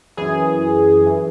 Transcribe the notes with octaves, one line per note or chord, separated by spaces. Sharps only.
F#2 E3 G#4
E3